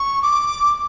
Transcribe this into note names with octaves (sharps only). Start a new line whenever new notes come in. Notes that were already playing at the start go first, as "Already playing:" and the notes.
Already playing: C#6
D6